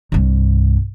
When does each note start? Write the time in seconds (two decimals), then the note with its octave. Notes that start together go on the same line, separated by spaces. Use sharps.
0.12 C2 G2